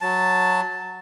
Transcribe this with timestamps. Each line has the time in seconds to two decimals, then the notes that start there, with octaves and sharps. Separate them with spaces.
0.01 F#3 A5